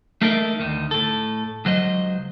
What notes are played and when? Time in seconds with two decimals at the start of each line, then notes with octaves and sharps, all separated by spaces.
0.21 A3 A#3 D#4 A4 A#4 E5
0.59 D2 D#3
0.91 A2 A4
1.65 C#2 F#3 C5 D#5